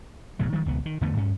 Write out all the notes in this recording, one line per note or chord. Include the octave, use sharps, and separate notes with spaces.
D1 B2 F#3 A3
D#3 F3 G3 G#3
E1 C#2 B3
D#3
E2 D3 A3 B3
G2 C#4